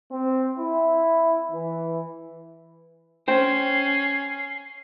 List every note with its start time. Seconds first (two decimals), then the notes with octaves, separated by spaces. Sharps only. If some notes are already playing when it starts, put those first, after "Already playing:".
0.12 C4
0.59 E4
1.51 E3
3.28 C#4 C5 G5 C7